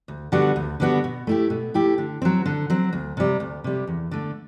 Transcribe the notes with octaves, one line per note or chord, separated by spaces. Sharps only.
D2
D3 G3 B3 F#4
D2
D3 G3 B3 F#4
B2
A3 E4 G4
B2
A3 E4 G4
D3
F#3 C4
D3
F#3 C4
D2
C3 G3
D2
C3 G3
E2
D3 A3